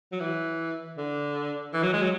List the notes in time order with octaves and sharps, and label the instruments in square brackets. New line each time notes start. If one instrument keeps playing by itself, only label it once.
[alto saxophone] F#3
E3
D3
E3
F#3
G#3
F#3